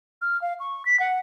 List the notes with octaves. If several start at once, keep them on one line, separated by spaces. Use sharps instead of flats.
F6
F5
C#6
B6
F#5